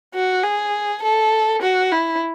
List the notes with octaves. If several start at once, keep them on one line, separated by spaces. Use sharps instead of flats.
F#4
G#4
A4
F#4
E4